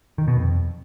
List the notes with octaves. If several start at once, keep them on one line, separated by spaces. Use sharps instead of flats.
D#3
B2
F2